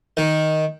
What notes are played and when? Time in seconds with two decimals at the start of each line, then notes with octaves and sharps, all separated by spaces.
0.17 D#3